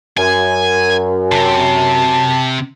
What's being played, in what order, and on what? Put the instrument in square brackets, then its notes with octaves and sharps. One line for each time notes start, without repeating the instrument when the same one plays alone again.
[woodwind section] F#2 [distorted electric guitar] G#5
[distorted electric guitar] C3 [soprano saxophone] A5